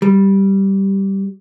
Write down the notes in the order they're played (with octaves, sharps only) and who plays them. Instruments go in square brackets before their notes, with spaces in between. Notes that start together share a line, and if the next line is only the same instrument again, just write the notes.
[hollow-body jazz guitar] G3